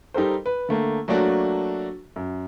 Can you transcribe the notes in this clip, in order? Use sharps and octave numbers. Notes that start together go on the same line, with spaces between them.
G3 D#4 G4 A4 A#4 C5
B4
D3 A3 A#3
F#3 A3 A#3 D4 F#4
F#2